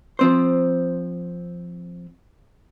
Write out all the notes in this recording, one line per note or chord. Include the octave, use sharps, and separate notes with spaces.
F3 C4 C5